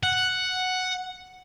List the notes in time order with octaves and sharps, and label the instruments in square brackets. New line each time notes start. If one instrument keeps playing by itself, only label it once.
[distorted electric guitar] F#5